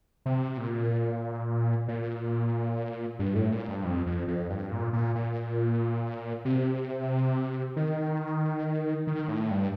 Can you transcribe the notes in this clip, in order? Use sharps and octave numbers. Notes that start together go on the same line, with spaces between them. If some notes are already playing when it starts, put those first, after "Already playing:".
C3
A#2
A#2
G2
A2
A#2
G2
F2
F2
F2
G2
A#2
A#2
A#2
C3
D#3
D#3
A2
G2